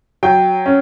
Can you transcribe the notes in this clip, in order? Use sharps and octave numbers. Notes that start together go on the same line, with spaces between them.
F#3 G5
C#4